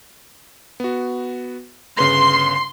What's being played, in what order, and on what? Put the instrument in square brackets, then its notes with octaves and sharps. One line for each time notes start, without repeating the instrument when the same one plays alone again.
[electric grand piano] B3 F#4
[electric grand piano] G1 C#3 B4 [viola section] C6